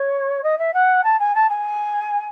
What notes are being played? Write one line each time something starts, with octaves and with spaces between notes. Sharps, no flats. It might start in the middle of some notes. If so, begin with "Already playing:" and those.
Already playing: C#5
D#5
E5
F#5
A5
G#5
A5
G#5